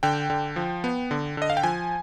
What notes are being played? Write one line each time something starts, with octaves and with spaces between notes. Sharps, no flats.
D3 G5
D3
F3
B3
D3
D3 D#5
F5
G5
F3 G#5